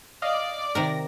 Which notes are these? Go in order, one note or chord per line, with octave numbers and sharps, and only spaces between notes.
D5 D#5 F5
C3 D#3 A#4 A#6